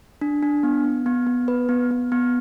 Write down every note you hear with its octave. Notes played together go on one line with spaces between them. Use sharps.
D4
D4
B3
B3
B3
B3
B4
B3
B3
B3